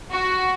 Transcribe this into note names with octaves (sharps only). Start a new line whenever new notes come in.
F#4